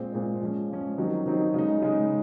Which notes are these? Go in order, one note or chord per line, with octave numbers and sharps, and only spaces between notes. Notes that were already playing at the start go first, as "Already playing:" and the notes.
Already playing: A#2 G#3 C4
A#2 G#3 C4
F3 G#3 C#4
F3 G#3 C#4
D#3 F#3 C4 D#4
D#3 F#3 C4 D#4
C#3 G#3 D#4
C#3 G#3 D#4